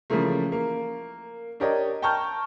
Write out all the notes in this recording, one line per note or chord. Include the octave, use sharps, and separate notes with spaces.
C#3 E3 F3 A3 A#3
A#3
D4 G4 A#4 C#5 D#5
G5 A5 A#5 C#6 F6 G6